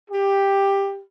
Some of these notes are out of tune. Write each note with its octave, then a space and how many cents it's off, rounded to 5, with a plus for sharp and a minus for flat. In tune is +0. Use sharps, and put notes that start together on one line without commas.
G4 +10